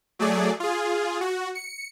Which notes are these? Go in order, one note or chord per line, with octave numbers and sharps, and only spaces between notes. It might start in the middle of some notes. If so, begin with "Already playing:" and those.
F#3 A3 G#4 D5
F4 G#4
F#4
C#7